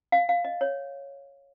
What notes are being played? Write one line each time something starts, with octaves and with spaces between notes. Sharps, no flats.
F5
F5
D#5
C#5